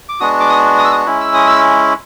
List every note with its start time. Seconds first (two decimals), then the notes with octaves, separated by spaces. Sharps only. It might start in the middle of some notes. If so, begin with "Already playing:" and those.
0.09 D6
0.20 G#3 B3 D4 F#4 D#6
0.40 D6
0.49 D#6
0.78 D#6
0.84 E6
0.92 D#6
1.06 G#3 C#4 E4
1.21 E6
1.34 D#6
1.47 E6